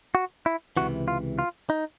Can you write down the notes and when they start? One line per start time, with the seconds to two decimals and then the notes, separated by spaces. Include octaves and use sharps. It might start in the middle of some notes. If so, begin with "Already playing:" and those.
0.15 F#4
0.46 E4
0.77 C#2 C3 E3 F#4
1.08 F4
1.39 F4
1.70 D#4